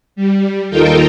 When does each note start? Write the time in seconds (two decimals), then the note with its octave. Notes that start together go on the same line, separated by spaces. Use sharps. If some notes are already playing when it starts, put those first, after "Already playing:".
0.16 G3
0.70 D#2 D#4 F4 A4 A#4 G5